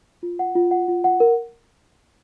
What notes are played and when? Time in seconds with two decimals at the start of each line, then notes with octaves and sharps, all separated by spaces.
0.23 F4
0.39 F#5
0.55 F4
0.71 F#5
0.88 F4
1.04 F#5
1.20 A#4